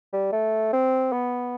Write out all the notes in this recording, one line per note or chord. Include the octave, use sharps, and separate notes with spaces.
G3
A3
C4
B3